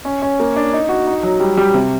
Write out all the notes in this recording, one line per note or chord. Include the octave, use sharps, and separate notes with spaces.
C#4
C#4
A#3
D4
D#4
F#4
D#4
F#3
G3
G3
C3